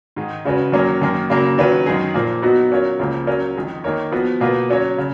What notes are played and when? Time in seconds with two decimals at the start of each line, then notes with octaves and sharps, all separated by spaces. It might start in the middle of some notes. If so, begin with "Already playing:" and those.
0.16 G#2 D#3 G#3
0.45 C#3 G#3 C#4 F#4 B4
0.72 F#2 D#3 F#3 A#3 C#4
1.01 F#2 D#3 A#3
1.30 C#3 F#3 A#3
1.58 D#3 F#3 C#4 F4 B4
1.86 F#2 D#3 G#3 D#4 G#4
2.14 A#2 F3 A#3
2.42 F#3 B3 D#4 F#4
2.71 F#3 C#4 F4 A#4 C#5
2.99 C#2 C#3 F3 A#3
3.27 F#3 C#4 F4 A#4
3.56 F2 D#3 G#3
3.84 D#3 A#3 D#4 A#4 C#5
4.12 F3 B3 F#4
4.40 B2 A#3 F4 B4
4.69 F#3 C#4 F#4 C#5
4.98 C#3